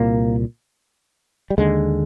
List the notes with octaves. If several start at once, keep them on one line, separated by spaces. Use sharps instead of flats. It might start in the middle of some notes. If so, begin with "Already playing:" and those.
Already playing: C2 A#2 A#3
G3
D#2 D3 G#3